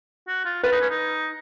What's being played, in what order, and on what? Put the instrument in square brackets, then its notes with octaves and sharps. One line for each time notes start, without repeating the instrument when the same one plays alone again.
[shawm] F#4
F4
[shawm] F4 [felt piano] B4
[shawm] D#4
C#4
D#4